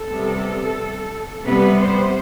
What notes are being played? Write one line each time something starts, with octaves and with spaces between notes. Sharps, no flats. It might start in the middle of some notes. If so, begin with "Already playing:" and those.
Already playing: A4
C3 G3 B3
C3 G3 B3 B4
C5